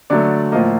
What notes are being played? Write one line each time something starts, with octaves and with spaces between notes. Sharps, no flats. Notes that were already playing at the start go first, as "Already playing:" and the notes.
D3 F#3 A3 D5
A2 F3 A#3 D#5